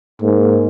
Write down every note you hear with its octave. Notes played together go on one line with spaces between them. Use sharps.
G#2 A#3